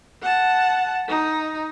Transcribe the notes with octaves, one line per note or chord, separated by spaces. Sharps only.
F#5 A5
D#4